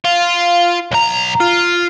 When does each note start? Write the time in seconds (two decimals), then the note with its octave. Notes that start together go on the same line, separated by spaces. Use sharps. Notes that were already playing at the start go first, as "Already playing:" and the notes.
0.05 F4
0.91 B1 A#5
1.40 F4